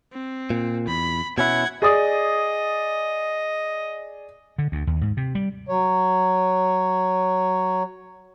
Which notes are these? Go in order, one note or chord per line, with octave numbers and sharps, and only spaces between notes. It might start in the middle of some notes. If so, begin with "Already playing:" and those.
C4
A#2
E2 B5
B2 C#4 E4 F#5 G#6
G#4 D5 D#5 D#6
D3
D2
D#2
G#2
C3
G3
F#3 C#5